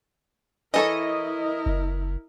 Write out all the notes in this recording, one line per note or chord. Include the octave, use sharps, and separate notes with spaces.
E3 E4 A4 A#4 C#5 D#5
F#1